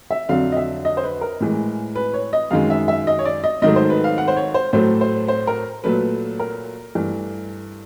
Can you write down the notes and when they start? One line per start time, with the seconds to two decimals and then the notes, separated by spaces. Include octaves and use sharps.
0.11 E5
0.29 F2 D3 F#3 F5
0.52 D#5
0.57 E5
0.85 D#5
0.97 C5
1.03 B4
1.21 A#4
1.40 A2 E3 G#3
1.95 B4
2.14 C#5
2.33 D#5
2.51 F#2 D#3 G#3 F5
2.70 E5
2.88 E5
3.07 D#5
3.19 C#5
3.25 D5
3.44 D#5
3.62 G#2 D#3 F#3 A3 D#5
3.76 C5
3.90 B4
4.04 F5
4.18 F#5
4.28 C5
4.36 C#5
4.54 C5
4.73 A2 F#3 A3 C5
5.01 C5
5.28 C5
5.47 A#4
5.84 A#2 F#3 A3 B4
6.40 A#4
6.95 G2 E3 A3